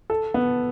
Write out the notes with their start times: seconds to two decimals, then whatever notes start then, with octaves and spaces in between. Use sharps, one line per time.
0.10 A4
0.34 B3